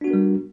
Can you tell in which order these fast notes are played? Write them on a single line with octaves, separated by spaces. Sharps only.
D4 F#4 B3 A#4 G3